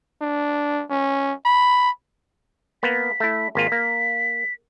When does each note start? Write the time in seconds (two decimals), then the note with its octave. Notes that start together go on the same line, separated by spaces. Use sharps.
0.22 D4
0.90 C#4
1.45 B5
2.83 A#3 B3 B6
3.20 A3 E4
3.55 G#1 A#3 F4 B6
3.72 A#3